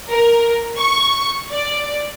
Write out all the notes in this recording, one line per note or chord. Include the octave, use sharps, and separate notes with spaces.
A#4
C#6
D5